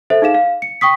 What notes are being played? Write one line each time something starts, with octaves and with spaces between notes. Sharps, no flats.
A4 C5 E5
D#4 G#4 F5 E7
F5
C#7
G5 C#6 D#6 B6